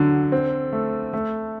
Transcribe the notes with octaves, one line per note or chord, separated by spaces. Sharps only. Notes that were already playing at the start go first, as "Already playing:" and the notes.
Already playing: D3 F#3
C4
A3
A3